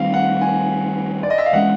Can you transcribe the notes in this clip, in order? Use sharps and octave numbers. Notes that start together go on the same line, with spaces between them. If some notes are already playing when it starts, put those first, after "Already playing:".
Already playing: D#3 G3 C4 F5
F#5
G#5
D5
D#5
E5
F5
E3 G#3 C#4 F#5